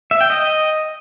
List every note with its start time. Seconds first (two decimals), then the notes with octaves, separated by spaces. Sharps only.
0.11 E5
0.21 G5
0.30 D#5